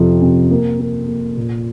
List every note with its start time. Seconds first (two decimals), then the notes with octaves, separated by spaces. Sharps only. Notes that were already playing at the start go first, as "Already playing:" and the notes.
Already playing: F2 C3
0.22 C3
0.51 A#3
0.79 A#3
1.08 A#3
1.37 A#2